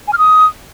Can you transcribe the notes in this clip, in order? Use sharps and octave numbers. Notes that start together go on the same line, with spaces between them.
G#5
F6
D#6